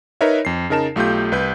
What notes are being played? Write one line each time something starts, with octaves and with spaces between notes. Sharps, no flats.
D#4 A#4 B4 C#5 E5
F2 C7
C#3 D#4 A#4 A5 E7
B1 A3 F4 G4 G6
C2 B4 G6